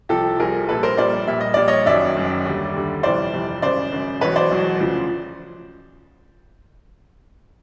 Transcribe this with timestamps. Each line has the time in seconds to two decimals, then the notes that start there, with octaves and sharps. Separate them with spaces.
0.09 C2 C3 F3 G4 A4
0.39 C2 C3 F3 G#4 A#4
0.69 A#1 A#2 G3 A4 B4
0.83 A#4 C5
0.97 A#1 A#2 G3 C5 D5
1.27 A#1 A#2 G3 E5
1.41 D#5
1.54 A#1 A#2 G3 D5
1.68 C#5 D#5
1.86 F#1 F#2 D#3 F#3 D5 E5
2.16 F#1 F#2 D#3 F#3
2.45 D#2 D3 G3
2.74 D#2 D3 G3
3.03 G1 F2 C3 E3 G3 C5 D5
3.33 G1 F2 C3 E3 G3
3.62 G#1 F#2 C#3 C5 D5
3.92 G#1 F#2 C#3
4.21 E1 E2 B2 F#3 B4 C#5
4.36 C5 D5
4.51 E1 E2 B2 F#3
4.80 D2 C#3 F3